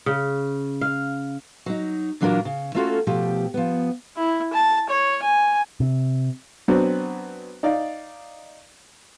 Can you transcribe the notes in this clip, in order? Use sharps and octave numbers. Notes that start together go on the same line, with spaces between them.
C#3
F5
F#3 D#4
A#2 E3 F#3 D4 F4 A#4
C#3
A3 A#3 C#4 F4 F#4 A4
B2 F3 A3 G4
F3 B3
E4
A5
C#5
G#5
C3
F#3 B3 C4 D4 F#4
D#4 D5 F5